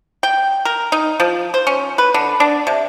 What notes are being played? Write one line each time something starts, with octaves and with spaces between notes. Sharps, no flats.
G5
A#4
D#4
F3
C5
C#4
B4
D3
D4
C3